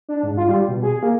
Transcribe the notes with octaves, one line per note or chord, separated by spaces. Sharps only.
D4
G#2
F4
G3
B2
G#4
A#3